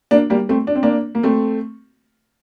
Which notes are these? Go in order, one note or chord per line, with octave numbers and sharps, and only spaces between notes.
A#3 D4
G3 A#3
A3 C4
D4
C4
A#3 D4
A#3
A3 C4